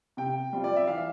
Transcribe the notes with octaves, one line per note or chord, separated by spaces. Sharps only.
C3 G5
G3 C4 F4
D5
E5
E3 F5